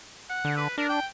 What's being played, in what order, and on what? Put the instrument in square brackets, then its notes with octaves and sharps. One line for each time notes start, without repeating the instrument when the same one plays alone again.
[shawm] F#5
[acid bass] D3
[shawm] B4
[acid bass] D4 [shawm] A#4
[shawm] G5